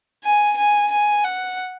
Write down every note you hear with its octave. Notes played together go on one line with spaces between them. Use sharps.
G#5
G#5
G#5
F#5